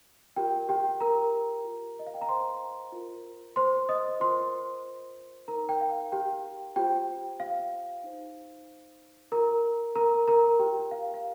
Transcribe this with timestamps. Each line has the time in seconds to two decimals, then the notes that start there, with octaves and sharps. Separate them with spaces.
0.36 F4 G4 A#4 G5
0.69 G4 G5
1.00 A#4 A#5
1.64 F4 A#4
1.99 D#5
2.07 F5
2.14 G5
2.21 A#5
2.29 C5 C6
2.92 F4 A#4
3.56 C5 C6
3.89 D#5 D#6
4.20 F4 A#4 C5 C6
5.48 D#4 A#4 A#5
5.69 G5
5.81 F5
6.12 G4 G5
6.76 F4 G4 C5 G5
7.40 F5
8.04 D#4 C5
9.32 F4 A#4 A#5
9.95 A#4 A#5
10.28 A#4 A#5
10.59 F4 G4 A#4 G5
10.91 F5
11.14 F5